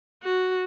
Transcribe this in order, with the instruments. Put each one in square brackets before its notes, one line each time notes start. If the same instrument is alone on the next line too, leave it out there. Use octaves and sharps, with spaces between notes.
[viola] F#4